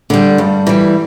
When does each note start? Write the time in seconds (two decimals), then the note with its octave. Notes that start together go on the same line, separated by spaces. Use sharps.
0.10 D3 G3
0.38 G2
0.67 E3 G3